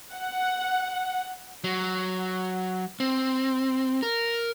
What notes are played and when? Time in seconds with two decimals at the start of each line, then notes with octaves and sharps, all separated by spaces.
0.14 F#5
1.64 F#3
3.00 C4
4.03 A#4